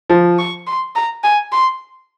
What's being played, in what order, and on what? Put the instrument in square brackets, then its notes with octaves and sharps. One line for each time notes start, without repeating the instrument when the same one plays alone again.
[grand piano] F3
[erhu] C#6
C6
A#5
G#5
C6